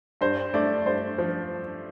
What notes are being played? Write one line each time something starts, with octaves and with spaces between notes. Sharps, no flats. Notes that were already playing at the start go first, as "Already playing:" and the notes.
G2 C5
A3 D5
G2 C5
F3